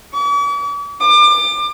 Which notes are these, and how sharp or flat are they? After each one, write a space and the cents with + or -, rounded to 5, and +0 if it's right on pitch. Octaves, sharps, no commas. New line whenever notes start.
D6 -45
D6 +30